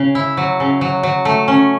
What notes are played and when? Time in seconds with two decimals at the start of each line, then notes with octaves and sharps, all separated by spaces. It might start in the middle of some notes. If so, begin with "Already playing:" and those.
Already playing: C#3
0.15 E4
0.37 F#3
0.60 C#3
0.81 F#3
1.03 F#3
1.25 A3
1.48 C#4